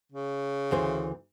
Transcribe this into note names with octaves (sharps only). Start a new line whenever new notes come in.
C#3
D2 E3 C5